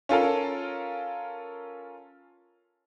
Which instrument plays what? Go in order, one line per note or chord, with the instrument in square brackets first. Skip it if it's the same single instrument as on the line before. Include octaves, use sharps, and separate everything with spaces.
[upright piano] C#4 F4 A4 A#4